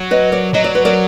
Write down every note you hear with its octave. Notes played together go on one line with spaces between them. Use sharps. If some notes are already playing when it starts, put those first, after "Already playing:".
Already playing: F#3
B4 D#5
A#4 D5
F#3 D#5
D5
B4
A#4 D5